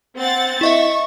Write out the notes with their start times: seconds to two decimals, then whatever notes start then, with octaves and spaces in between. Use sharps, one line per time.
0.18 C4 F#5 A6
0.61 E4 D#5 E5 C#6